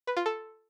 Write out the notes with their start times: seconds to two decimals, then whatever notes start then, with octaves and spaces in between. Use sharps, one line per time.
0.07 B4
0.17 F4
0.26 A4